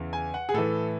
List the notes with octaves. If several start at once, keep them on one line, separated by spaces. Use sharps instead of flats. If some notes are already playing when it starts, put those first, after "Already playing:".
Already playing: E2 C#3 E3
G#5
F#5
G#4
A2 E3 A4